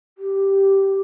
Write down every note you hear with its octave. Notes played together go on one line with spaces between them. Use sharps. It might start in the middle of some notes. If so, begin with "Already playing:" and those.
G4